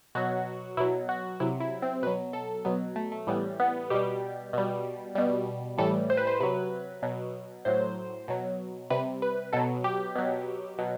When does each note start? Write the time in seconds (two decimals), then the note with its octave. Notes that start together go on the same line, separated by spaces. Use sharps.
0.15 B2 F#3 F#4
0.77 B2 F#3 E4
1.09 F#4
1.40 C3 F#3 E4
1.60 E4
1.82 C4
2.03 B2 F#3 B4
2.33 A4
2.65 B2 F#3 B3
2.96 A3
3.12 A3
3.27 A2 E3 G3 B3
3.60 B3
3.90 B2 G3 G4
4.53 B2 G3
5.15 B2 G3
5.78 A2 E3 G3 A4
6.10 C5
6.17 B4
6.27 C5
6.40 C3 F#3 B4
7.02 B2 F#3
7.65 A2 F#3 C5
8.28 B2 F#3
8.90 C3 G3 B4
9.22 B4
9.53 B2 F#3 A4
9.84 G4
10.16 B2 F#3
10.78 B2 F#3